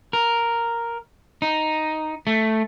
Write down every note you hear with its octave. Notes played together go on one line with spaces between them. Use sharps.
A#4
D#4
A3